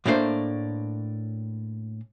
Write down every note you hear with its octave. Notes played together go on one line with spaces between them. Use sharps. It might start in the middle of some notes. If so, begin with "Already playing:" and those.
A2 A3 A#3 D4 E4 C5